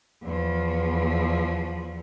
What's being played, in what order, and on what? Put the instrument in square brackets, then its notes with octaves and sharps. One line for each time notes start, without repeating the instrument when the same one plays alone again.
[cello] E2 F3